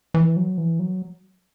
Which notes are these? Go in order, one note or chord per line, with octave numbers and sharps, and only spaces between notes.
E3
F#3
E3
F#3